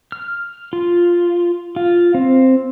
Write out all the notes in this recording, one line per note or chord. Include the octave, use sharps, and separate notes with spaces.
F6
F4
F4
C4